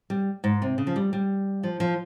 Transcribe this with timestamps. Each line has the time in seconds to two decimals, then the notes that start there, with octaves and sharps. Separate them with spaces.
0.10 G3
0.44 G#2
0.62 C3
0.78 C#3
0.87 F3
0.96 G3
1.13 G3
1.63 F3
1.80 F3